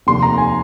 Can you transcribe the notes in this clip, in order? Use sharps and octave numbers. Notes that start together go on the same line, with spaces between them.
F1 D#2 D#3 C6
A#5
G#5